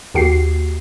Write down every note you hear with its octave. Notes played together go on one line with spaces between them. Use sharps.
D#2 F#4 G4 C7